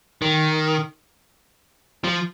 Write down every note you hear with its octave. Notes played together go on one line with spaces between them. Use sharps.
D#3
F3